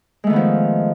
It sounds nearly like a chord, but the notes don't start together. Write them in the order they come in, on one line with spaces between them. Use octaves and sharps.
G#3 A3 D#3 B3 F3